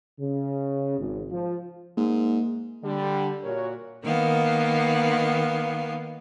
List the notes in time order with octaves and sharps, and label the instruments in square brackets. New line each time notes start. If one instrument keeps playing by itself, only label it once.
[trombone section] C#3
G#1
F3
[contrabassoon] G#2 [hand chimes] A#3
[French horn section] D3 G3
A#2 F#4 A#4 C#5
[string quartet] D#3 A#3 B3 F5